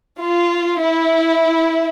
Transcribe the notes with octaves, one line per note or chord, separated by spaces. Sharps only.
F4
E4